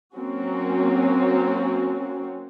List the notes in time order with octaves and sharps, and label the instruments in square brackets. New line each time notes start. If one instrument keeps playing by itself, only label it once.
[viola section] F#3 A#3 C4 C#4 F#4